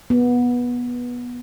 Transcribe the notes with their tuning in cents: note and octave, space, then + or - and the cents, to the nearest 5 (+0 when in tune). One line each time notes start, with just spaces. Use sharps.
B3 -15